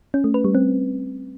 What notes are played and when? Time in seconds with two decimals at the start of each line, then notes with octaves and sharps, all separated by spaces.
0.14 C#4
0.24 A3
0.34 B4
0.44 G3
0.55 C4